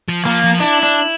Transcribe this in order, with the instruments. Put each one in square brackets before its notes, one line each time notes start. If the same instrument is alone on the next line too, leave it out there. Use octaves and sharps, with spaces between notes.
[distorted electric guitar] F3
[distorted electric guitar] F3 [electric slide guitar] A#3
[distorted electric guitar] F3
[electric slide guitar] D4 [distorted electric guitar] E4
[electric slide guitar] D4